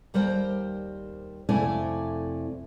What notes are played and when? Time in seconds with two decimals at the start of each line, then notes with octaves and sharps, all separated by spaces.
0.14 D#2 G3 A#4 C5 G5
1.49 F2 C3 A3 E4 D5 G#5